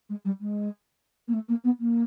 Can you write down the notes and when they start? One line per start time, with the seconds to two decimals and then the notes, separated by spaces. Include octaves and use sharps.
0.10 G#3
0.25 G3
0.41 G#3
1.28 A#3
1.34 A3
1.49 A#3
1.64 B3
1.80 A#3